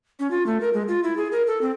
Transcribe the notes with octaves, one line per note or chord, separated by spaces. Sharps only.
C#4
F4
A3
A#4
G#3
F4
E4
G#4
A#4
A4
C4